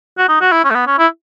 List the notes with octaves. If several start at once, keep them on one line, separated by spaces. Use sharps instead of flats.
F#4
D#4
F#4
E4
C#4
A3
B3
C#4
E4